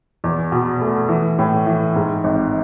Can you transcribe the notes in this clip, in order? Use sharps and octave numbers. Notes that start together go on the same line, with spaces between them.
E2
B2
A3
E3
A2
E3
G#2
G#1